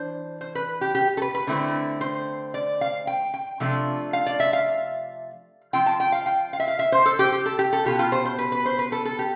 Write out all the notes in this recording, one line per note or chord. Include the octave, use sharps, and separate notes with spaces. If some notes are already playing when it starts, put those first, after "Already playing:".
Already playing: E3 D4 C5
C5
B4
G4
G4
A4
B4
B4
D3 A3 C4 E4
C5
D5
F5
G5
G5
C3 F3 A3 D4 F4
F5
D5
E5
F5
F3 C4 F4 G5
A5
G5
F5
G5
F5
E5
F5
E5
C5
A4
G4
G4
A4
G4
A4
B2 B3 F4 G4
F4
C5
C5
B4
B4
C5
B4
A4
A4
G4